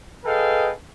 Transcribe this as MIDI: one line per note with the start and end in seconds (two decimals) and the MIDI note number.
0.25 0.71 68
0.25 0.71 69
0.25 0.71 71
0.25 0.71 75
0.25 0.71 77
0.25 0.71 79